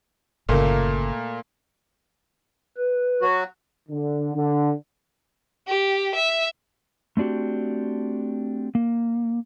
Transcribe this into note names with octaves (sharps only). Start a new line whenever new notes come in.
G1 A#2 C#3 A3 A#3
B4
F#3 F#4
D3
D3
G4
E5
A3 C4 D4 F#4 G4
A#3